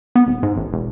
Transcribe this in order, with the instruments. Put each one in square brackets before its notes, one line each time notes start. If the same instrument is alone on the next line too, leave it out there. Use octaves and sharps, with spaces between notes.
[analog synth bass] B3
D#1
G#2
A1
E1